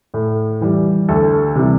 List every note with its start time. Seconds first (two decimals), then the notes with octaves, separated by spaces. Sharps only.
0.14 A2
0.61 E3 G3
1.09 D2 A4
1.56 C3 E3 G3